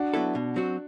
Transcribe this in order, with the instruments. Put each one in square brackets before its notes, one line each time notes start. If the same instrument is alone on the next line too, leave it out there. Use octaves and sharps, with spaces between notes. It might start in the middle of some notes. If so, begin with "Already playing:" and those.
Already playing: [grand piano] D4 F#4
[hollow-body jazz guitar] F#3 B3 E4 A4
B2
F#3 C4 F#4